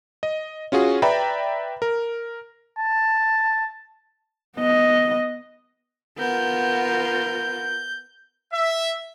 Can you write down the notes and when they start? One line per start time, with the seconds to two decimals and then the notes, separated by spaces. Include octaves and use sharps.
0.23 D#5
0.72 C#4 F4 F#4 G#4
1.02 B4 D5 E5 G5 A#5 B5
1.82 A#4
2.79 A5
4.57 B3 D#5
6.18 B3 F4 A#4 G6
8.53 E5